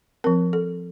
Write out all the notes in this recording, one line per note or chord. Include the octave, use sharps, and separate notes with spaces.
F3 C4 A#4
A4